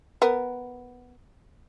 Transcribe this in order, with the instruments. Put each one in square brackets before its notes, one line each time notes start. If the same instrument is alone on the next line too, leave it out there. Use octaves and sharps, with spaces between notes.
[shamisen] B3 A#4